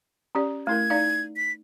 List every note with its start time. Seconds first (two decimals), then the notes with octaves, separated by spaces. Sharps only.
0.35 C#4 G4 D5
0.67 A3 E4 A#4 G#6
0.90 D#4 D5 F5
1.37 B6